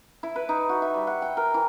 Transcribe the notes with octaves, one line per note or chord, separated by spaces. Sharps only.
E4
B4
D#4
F#4
E5
G3
F#5
G5
A#4
E3